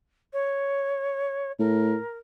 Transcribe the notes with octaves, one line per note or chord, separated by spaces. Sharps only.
C#5
A2 A#4